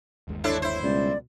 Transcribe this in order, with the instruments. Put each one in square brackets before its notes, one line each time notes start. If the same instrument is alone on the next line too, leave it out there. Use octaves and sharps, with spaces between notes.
[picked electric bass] G1 D#2 G#3
[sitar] D4 E4 A4 [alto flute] C#5
[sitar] E4 C5
[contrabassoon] C#2 [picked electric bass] B2 G3 [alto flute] D5